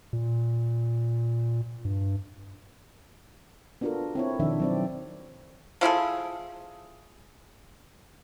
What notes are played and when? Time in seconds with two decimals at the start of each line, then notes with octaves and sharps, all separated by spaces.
0.13 A#2
1.85 G2
3.81 B3 D4 F4 F#4 A4 A#4
4.15 C4 E4 C#5
4.40 B2 D#3 F3 D4 E5
4.60 F#3 C4 D5
5.81 F3 E4 G#4 A4